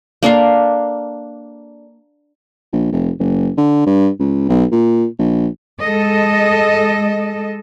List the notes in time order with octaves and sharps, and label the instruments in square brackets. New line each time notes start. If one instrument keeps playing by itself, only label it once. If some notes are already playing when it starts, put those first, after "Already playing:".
[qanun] A#3 D4 A4 F5
[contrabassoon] A#1
F1
F#1
D3
G2
C#2
B1
A#2
A#1
[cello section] G#3 A4 D#5